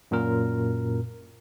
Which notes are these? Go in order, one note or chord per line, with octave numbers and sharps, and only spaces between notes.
F#2 A#2 A#4